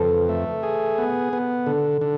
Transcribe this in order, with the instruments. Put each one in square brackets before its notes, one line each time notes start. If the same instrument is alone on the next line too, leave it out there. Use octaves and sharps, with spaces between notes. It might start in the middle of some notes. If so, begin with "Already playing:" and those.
Already playing: [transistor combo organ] F2 [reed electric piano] A4 B4
[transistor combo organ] A3
G#4
B3
B3
[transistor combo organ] D3 [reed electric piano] A4
[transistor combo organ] D3